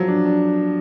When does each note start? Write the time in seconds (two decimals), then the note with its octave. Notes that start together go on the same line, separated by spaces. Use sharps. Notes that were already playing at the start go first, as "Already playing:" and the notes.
Already playing: F3 F#3
0.08 D4
0.25 D4